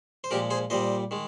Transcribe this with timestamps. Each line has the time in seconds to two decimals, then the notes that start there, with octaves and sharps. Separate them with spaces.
0.24 C5
0.31 A#2 F3 G#3 G4 A#4
0.50 G#4 C5
0.70 A#2 G3 C5 D#5
1.11 D#3 G#3